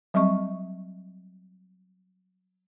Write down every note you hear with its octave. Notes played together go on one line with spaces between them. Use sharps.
F#3 G3 C4 D#5 C#6